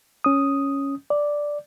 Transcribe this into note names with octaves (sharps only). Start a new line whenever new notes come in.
C#4 D#6
D5